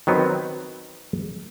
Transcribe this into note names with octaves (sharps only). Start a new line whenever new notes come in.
D#3 F#3 B3 C4